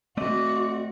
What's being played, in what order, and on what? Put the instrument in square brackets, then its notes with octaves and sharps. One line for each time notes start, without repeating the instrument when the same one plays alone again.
[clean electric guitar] A3 C4 D#5 [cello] F#4 [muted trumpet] D5